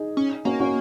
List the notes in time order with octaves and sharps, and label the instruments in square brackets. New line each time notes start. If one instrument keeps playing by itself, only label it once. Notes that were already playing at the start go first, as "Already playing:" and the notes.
Already playing: [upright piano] D#4 G#4
[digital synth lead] C#4
[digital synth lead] A#3 [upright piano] C#4 F#4
[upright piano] C#4 F#4